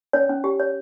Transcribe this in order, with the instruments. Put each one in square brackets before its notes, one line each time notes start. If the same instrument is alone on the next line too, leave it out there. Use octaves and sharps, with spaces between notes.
[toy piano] C#4 C#5
C#4
G4
C#5